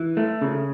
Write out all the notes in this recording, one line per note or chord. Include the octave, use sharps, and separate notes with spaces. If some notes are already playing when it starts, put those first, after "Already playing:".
Already playing: E3
A3
C#3